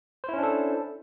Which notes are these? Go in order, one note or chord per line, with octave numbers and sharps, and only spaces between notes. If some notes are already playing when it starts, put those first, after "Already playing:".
C#4 D4 E4 A4 C5